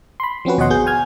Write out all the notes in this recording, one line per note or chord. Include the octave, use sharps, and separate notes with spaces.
B5 C6
F3 C4 C#4 F#4 B4
D#2 B2 C#5 D#5 F#5 C6
G#1 B3 F#4 G#4 G6
G#5 F6 G#6